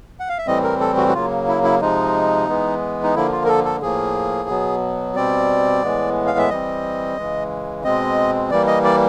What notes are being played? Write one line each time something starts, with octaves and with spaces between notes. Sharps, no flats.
F#5
F5
E5
A2 E3 G3 C4 D#5
A#4
A4
F#4
F#4
C#3 F#3 A#3 F4
E4
E4
C3 F3 G#3 D#4
E3 G#3 B3
D#4
D3 F3 A#3 E4
F4
A#4
A4
A4
A2 F3 A#3 G#4
B2 F#3 B3
B2 G3 C4 D5
A2 E3 G#3 B3
F5
E5
E3 G3 C4 D#5
C#3 E3 G#3
B2 G#3 C4 D#5
E3 G3 A#3 D5
D#5
D5